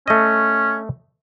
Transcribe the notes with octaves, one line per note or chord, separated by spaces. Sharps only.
A3 C#4 D#5